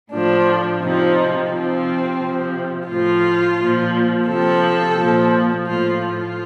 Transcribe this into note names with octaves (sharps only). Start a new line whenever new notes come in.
A2 F3 D4
C3 F3 D#4
C3 F3 C4
C3 F3
A2 F3 F4
A#2 F3
C3 F3 A4
A#2 F3
A2 F3 F4
F4